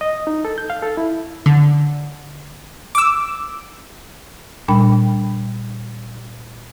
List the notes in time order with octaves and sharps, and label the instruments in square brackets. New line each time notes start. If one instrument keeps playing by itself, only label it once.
[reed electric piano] D#5
D#4
A4
G6
F5
A4
E4
[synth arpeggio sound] D3
D6 E6
[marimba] A#2 G3 D4 G5 B5